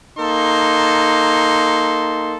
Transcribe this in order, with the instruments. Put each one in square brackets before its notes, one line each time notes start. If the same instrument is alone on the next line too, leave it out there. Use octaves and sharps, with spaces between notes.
[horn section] A#3 D#4 A4 C6